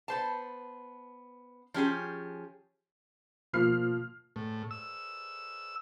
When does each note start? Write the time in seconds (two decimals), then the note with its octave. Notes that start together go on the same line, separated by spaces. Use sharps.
0.08 B3 C5 A5
1.74 F3 C#4 G4 G#4
3.53 B2 F3 A#3 F4 F6 C7
4.36 A2
4.71 E6